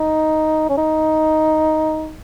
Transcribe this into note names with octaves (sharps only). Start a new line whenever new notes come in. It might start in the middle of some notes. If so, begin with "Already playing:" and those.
Already playing: D#4
C#4
D#4